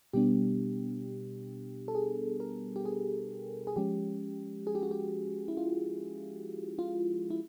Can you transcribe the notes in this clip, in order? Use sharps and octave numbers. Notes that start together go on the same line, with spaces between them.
B2 G3 B3 D4 G4
A4
G#4
A#4
G4
G#4
G#4
F3 G#3 C#4 G4
G#4
G4
F#4
G4
E4
F4
F4
E4